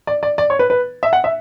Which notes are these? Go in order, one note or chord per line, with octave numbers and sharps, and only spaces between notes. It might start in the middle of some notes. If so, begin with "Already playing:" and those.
D5
D5
D5
C#5
B4
B4
E5
F#5
E5